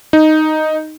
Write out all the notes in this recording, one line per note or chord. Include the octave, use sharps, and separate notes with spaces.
D#4